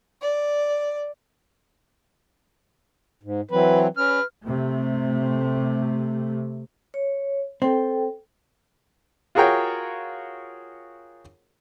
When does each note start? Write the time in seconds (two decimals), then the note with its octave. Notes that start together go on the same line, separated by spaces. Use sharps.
0.22 D5
3.23 G#2
3.51 E3 F#3 C4 B4
3.97 C#4 B4 F6
4.45 C3 A3
6.94 C#5
7.62 C4 A4 G5
9.35 F4 F#4 G#4 A#4 C#5 G5